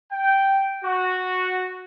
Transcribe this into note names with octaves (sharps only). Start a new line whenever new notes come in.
G5
F#4